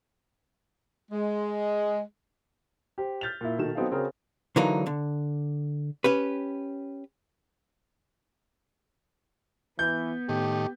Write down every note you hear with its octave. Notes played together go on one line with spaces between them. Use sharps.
G#3
G4 C5
F6 G6 A6 B6 F7
A#2 E4
B2 D#3 A4 E7
F#3 B3 C4 D#4 A4 F5
C#3 C4 F#4 G#4 A#4
D3 E3 F#3 A#3 D#4
D3
C#4 G4 B4
E3 B3 G6
A2 D#3 G4